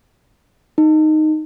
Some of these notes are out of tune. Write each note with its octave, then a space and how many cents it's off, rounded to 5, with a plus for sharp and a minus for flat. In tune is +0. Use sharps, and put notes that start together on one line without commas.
D#4 -5